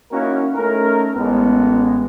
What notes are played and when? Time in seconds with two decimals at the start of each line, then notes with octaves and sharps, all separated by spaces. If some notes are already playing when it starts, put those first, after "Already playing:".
0.11 A#3 C#4 D#4 E4 F#4 A#4
0.55 A3 C#4 D#4 A#4
1.16 A1 G#3 B3